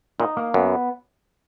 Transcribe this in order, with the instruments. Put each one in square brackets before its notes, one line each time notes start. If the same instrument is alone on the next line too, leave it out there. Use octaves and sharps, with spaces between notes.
[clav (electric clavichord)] A#2 [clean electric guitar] D#4
[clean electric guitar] A#3
[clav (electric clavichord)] F#2 [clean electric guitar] B3